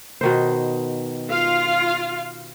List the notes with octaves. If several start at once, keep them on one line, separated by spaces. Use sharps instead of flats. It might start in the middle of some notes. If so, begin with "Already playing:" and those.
B2 D#3 C5
F4 F5